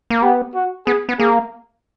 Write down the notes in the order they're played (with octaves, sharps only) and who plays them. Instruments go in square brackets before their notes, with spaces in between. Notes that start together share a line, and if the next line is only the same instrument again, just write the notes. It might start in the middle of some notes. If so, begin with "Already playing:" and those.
[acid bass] A#3
[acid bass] B3 [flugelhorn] G4
[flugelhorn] F#4
[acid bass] B3 [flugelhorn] G#4
[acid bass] B3
[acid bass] A#3 [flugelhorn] G#4